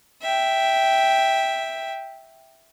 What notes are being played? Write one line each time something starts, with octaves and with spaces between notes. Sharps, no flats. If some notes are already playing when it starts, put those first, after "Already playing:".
E5 G5